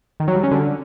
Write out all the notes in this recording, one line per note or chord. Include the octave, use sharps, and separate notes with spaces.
D#3
F#3
G3
C#4
D3